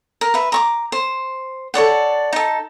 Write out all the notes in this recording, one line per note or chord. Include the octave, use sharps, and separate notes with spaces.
A#4
B4 E5
A#5 C#6 D6
C5
A4 C#5 D5 F#5
D#4 A4